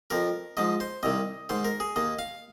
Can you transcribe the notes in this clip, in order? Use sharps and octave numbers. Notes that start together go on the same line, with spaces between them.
F2 F3 A#4
G#2 F3 D#5
C5
C2 C3 D#3 D#5
G#2 D#3 C5
A#4
G#4
D#2 D#3 D#5
F5